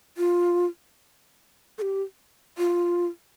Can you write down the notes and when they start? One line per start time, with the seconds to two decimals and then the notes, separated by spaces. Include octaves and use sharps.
0.17 F4
1.78 A4
1.82 G4
2.58 F4